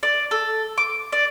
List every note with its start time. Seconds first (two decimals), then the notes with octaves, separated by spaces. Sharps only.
0.03 D5
0.31 A4
0.78 D6
1.12 D5